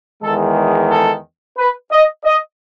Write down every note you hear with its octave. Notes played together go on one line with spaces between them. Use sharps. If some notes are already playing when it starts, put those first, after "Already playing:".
E2 D#3 G#3 A4
A4
B4
D#5
D#5